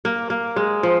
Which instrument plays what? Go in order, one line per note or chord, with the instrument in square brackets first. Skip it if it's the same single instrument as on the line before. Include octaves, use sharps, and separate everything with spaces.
[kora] A#3
A#3
G#3
F3